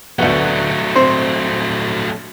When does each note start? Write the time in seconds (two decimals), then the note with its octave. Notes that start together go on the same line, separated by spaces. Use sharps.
0.19 D2 F#3 A3 B3
0.96 C4 C5